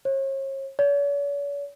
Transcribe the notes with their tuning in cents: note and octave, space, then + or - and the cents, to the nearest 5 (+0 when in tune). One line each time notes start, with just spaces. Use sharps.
C#5 -40
C#5 +45